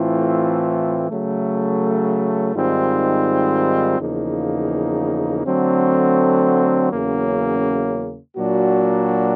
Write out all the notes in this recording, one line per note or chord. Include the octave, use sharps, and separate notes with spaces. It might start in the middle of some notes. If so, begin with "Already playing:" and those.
Already playing: A2 E3 A3 C4 F4
C#3 F#3 A3
G#2 D#3 G3 C4 F4
E2 C#3 F3 A#3 D#4
D3 F#3 A3 C4
E2 C#3 F#3 A#3 C#4
A#2 F#3 A#3 D4 F#4